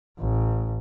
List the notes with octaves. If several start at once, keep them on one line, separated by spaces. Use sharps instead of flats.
A1